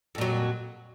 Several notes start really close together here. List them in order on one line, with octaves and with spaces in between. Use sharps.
F2 A#2 F#3